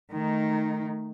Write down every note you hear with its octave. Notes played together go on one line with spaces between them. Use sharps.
D#3 A3 D#4